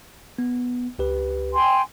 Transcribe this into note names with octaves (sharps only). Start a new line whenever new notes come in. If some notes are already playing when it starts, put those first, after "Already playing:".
B3
C#2 G4 B4
G5 G#5 C6